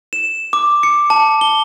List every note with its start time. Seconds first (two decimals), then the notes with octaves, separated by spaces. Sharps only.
0.13 E7
0.53 D6
0.83 C#7
1.10 A5
1.41 G7